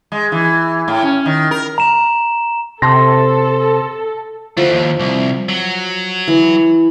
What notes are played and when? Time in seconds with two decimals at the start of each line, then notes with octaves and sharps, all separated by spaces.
0.12 G#3
0.32 E3
0.88 A2
1.03 C#4
1.26 D#3
1.51 A#4
1.78 A#5 E7
2.82 C3 A4 A5 C6 A#6
4.57 F3 A3 F#4
4.71 D#2
5.00 C2
5.49 F#3
6.28 E3